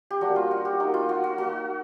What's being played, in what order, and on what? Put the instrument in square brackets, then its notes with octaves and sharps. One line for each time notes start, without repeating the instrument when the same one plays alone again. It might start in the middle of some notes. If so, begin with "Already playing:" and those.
[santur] G4
G3 A#3 D4 F#4
F4
F#4
G4
A#3 D#4 F#4
F4
F#4
F#4
A#3 D#4 F#4